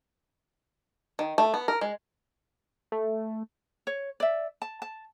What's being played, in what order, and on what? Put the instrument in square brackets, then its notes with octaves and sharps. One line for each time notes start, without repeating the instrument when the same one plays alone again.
[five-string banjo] D#3
A3
B3
A#4
G#3
[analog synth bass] A3
[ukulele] C#5
D5 E5
A5
A5